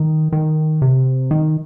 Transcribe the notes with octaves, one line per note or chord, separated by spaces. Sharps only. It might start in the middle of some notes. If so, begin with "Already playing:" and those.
Already playing: D#3
D#3
C3
D#3